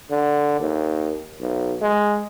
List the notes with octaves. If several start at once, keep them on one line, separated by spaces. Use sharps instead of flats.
D3
D#2
B1
G#3